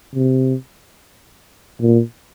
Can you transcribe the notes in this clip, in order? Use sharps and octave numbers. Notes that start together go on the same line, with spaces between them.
C3
A#2